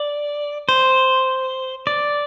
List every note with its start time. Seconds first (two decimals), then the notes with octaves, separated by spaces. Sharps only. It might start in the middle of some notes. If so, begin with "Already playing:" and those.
Already playing: D5
0.69 C5
1.87 D5